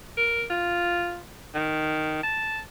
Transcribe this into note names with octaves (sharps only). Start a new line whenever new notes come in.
A#4
F4
D#3
A5